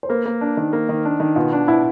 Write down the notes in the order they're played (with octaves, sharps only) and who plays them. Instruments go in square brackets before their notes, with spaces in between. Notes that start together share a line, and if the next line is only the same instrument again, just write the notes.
[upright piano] C5
[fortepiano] A#3 [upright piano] B4
[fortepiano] A#3
D4
D#3
A#3
D#3
D4
D#3
[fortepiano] B2 [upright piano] F4
[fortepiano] D4
[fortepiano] B2 [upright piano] E4